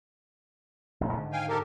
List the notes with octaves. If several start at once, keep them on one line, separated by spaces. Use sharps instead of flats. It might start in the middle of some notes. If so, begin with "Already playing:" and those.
A1 F3
G#2 D3 D#3
F5 G5 G#5
G4 A4 A#4